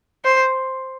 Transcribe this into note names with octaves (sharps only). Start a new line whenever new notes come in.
C5